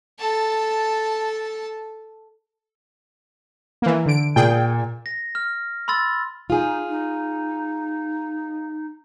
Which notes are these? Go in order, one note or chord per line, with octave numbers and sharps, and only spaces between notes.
A4 A5
E3 A#3
D3 D7
A#2 G#4 G5
A#6
F6
B5 C6 E6 A6
D#4 F4 G#4
D#4